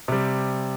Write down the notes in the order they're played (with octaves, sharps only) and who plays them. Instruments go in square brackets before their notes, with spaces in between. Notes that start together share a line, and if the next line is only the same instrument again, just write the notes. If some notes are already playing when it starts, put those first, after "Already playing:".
[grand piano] C3 G3